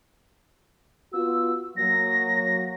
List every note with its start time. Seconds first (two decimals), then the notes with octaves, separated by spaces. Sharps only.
1.13 B3 F4 F#4 E6
1.77 F#3 A#3 A#6